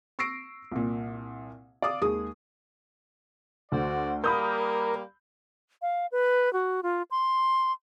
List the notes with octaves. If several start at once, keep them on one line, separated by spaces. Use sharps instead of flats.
C#6 E6 A#6 C7 D7
C2 A#2
D5 F5 D6 D#6
D#2 G#3 G#4 D#6
D2 F#4 C5 D5
G3 A#3 A#4 B5 D#6 G6
F5
B4
F#4
F4
C6